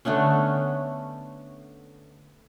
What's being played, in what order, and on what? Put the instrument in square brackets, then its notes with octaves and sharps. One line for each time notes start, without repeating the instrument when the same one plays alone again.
[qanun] D3 A3 B3 C#4